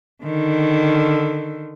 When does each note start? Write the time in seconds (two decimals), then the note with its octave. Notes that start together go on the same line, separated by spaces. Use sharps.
0.23 D3 D#3